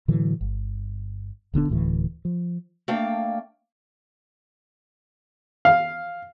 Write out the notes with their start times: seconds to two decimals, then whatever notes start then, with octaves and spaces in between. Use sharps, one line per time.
0.08 A2 D3 E3 F#3
0.41 G1
1.54 D#1 D3 B3 D4
1.69 D1 D2 A2 E3
2.25 F3
2.88 A3 A#3 D4 F5 G5
5.65 F5